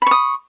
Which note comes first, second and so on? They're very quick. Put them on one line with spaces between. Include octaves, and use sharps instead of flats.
B5 C#6 D#6